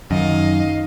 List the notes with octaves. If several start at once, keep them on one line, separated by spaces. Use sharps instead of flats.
F#2 D#3 D#5 F5